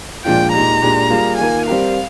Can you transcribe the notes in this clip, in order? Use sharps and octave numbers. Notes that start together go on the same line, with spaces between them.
A#2 F3 G#3 D4 F4 G5
A#2 G#3 D#4 G4 A#5
A#2 G#3 D4 G4
G3 A#3 F4 G#4
D#3 A#3 F4 A#4 G#5
G3 C4 G4 A#4 F5